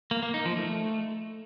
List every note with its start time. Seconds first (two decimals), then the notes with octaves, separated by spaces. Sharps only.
0.11 A#3
0.23 A#3
0.34 D#4
0.45 F3
0.57 A3